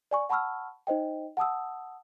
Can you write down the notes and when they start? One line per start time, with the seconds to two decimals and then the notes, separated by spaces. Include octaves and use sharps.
0.11 D5 G#5 C#6
0.29 F#5 A5 B5 C#6 E6 F6
0.87 D#4 C5 D#5 G5
1.37 F#5 A5 D#6 E6